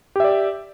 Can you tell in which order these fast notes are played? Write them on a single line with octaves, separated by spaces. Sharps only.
G4 E5 D5